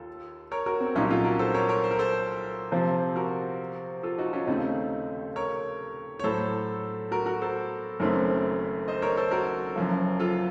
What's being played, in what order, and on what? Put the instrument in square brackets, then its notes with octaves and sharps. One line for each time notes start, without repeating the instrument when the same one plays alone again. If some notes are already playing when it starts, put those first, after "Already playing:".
Already playing: [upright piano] D#2 [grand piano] F4 A4
[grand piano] A#4 C#5
F#4 A#4
C4
[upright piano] C2 A#2 F#3 A#3 D#4 [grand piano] C#4
[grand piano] F4 A4
F#4 A#4
A4 C5
A#4 C#5
A#4 C#5
C5
A#4
A4 C5
[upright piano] C3 F3 C4
[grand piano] F#4 A#4
F4 A4
D#4 F#4
C#4 F4
[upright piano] D#2 C#3 A3 [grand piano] C4 D#4
[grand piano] A#4 C#5
C#5
[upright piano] A2 F#3 A3 [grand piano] A4 C5
[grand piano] F#4 A#4
F#4 A#4
A4 C5
[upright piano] F#1 F#2 D#3 A3 C4 [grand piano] A#4 C#5
[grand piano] C5 D#5
A#4 C#5
A4 C5
F#4 A#4
[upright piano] F#1 F#2 F3
[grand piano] F4 A4